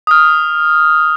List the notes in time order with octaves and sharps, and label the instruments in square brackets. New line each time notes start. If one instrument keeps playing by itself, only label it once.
[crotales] D#6 F6